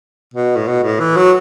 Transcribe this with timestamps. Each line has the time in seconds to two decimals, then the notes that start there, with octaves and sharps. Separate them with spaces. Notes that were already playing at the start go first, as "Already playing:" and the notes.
0.34 B2
0.56 A2
0.67 B2
0.83 A2
1.00 E3
1.17 F#3